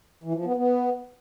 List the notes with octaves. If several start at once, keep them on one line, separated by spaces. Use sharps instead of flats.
E3
F3
B3
B3